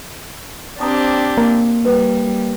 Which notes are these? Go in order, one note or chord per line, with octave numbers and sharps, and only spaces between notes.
C4 D4 G4 C5 A#5 D#6
A#3
G3 B4